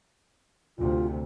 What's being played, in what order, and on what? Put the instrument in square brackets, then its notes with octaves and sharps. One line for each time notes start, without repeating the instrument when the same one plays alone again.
[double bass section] D2 C3 [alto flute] F4